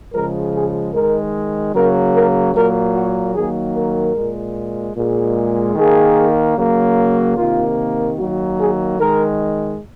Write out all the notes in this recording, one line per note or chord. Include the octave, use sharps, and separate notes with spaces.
C#3 F3 G#3 A#4
G#4
D#3 G#3 A#4
C#3 F#3 A#3 A#4
A#4
A#2 F#3 A#3 A#4
F#4
D#3 F#3 A#3 G#4
A#4
A#2 G#3
A#2 G#3
D#3 A#3 G#4
C#3 F#3 A#3
C3 D#3 A#3 F4
D#3 F#3 A#3 F#4
G#4
D#3 G#3 A#4